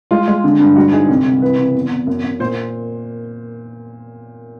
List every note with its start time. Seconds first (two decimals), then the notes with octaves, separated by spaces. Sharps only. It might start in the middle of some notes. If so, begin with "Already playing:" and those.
0.11 G#3 F4
0.27 G#3
0.44 D3
0.59 G2
0.76 G#3 F#4
0.92 G#2 G#4
1.08 C2
1.26 C2
1.41 E3 B4
1.58 C#3
1.75 E2
1.91 E2
2.07 F#2
2.23 F#2
2.39 A#2 C5